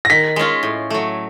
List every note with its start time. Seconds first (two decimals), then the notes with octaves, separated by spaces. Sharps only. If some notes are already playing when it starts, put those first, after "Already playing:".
0.05 A#6
0.10 D#3 B6
0.36 G#3 C#4 F4
0.63 A2
0.90 F#3 A3